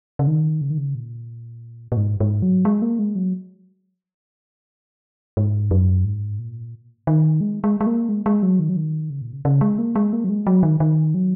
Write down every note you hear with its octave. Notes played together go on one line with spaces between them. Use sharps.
C#3
D#3
C#3
D#3
C#3
A#2
A#2
G#2
G#2
F#3
G#3
A#3
G#3
F#3
G#2
F#2
G#2
A#2
D#3
G#3
G#3
G#3
A#3
G#3
G#3
F#3
D#3
F#3
D#3
C#3
A#2
C#3
C#3
G#3
A#3
G#3
A#3
F#3
G#3
F#3
D#3
D#3
F#3